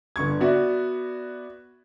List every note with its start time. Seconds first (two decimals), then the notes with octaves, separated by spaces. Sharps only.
0.16 G1 D3 C#6 G#6
0.41 B3 F#4 D5 E5